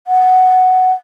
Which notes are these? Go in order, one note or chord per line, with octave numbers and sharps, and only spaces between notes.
F#5